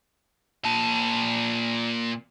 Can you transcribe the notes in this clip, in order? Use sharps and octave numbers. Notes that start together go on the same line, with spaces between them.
A#2 A5